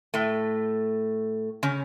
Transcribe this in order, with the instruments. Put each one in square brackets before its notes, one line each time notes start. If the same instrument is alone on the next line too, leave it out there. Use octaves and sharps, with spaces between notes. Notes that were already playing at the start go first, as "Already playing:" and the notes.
[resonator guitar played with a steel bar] A2 A3
C#3 C#4